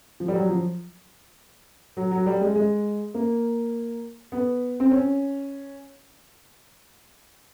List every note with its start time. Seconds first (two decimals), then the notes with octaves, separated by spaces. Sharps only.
0.20 F3
0.28 G3
0.35 F#3
0.49 F3
1.97 F#3
2.11 F#3
2.26 G3
2.41 G#3
2.56 G#3
3.14 A#3
4.32 B3
4.80 C4
4.91 C#4